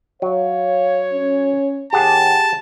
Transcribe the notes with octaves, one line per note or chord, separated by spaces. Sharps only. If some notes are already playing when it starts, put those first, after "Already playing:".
F#3 C#5 F5
C#4
D#2 G4 G#4 F#5 A5